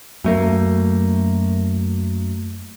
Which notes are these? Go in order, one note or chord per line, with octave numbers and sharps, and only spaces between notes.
F#2 A3 A#3